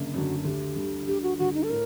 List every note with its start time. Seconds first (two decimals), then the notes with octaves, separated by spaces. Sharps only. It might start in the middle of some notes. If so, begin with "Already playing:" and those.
Already playing: F#1 F#2 D3
0.13 F#2 D3 F#4
0.44 D2 G4
0.76 D3 G3
1.07 D2 G4
1.23 F#4
1.38 D3 G3 F#4
1.54 D#4
1.63 A4
1.69 A2 A#4